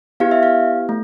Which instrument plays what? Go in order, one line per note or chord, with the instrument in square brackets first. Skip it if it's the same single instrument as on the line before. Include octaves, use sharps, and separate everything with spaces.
[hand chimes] B3 E4 G4 F5
E5
F5
A3